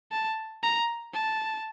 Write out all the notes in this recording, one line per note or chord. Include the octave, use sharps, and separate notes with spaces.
A5
A#5
A5